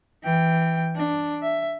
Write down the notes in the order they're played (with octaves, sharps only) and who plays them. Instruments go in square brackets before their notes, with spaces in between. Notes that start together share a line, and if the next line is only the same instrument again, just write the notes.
[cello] E3 G5
D4
E5